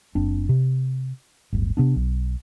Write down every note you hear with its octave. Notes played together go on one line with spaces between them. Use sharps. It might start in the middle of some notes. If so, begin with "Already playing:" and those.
F#1 C4 D4
C3
D1 G1
C3 B3 D4
B1